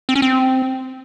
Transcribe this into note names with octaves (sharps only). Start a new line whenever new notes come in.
C4
C#4
C4